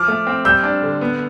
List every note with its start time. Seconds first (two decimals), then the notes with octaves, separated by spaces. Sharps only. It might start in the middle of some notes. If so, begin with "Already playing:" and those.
Already playing: F3 D6 F6
0.08 A3
0.27 C4
0.45 G3 E6 G6
0.63 D4
0.82 D3
1.01 B3